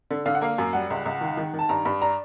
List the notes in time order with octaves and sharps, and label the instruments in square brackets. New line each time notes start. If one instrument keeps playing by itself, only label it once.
[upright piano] D3
D3 F5
F#5
A#3 F5
F#2
G3 F#5
C#2
C#2
D#3
D#3
D#3
A5
G2 A#5
G2 B5
D4 A#5